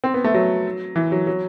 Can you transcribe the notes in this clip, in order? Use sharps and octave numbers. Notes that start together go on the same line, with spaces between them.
C4
B3
A3
F#3
E3
F#3
F#3